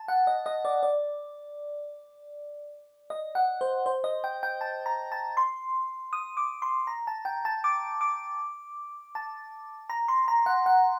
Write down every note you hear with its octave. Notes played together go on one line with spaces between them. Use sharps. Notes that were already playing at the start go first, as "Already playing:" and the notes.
Already playing: A5
F#5
D#5
D#5
D5
D5
D#5
F#5
C5
C5
D#5
G5
G5
A5
A#5
A5
C6
D#6
D6
C6
A#5
A5
G5
A5
D6
D6
A5
A#5
C6
A#5
F#5
F#5